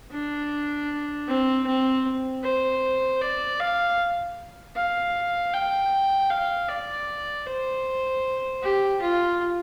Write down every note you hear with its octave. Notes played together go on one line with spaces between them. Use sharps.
D4
C4
C4
C5
D5
F5
F5
G5
F5
D5
C5
G4
F4